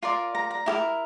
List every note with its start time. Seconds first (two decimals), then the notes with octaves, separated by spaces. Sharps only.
0.03 F4 A#4 D5 C6
0.35 A#5
0.51 A#5
0.66 E4 G4 A#4